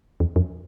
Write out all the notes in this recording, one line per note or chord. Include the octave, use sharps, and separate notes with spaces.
E2
F2